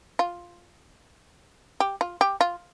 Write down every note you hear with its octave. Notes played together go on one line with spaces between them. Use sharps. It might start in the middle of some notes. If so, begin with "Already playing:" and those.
F4
G4
F4
G4
F4